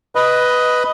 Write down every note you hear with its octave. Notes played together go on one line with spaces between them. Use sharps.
B4 D#5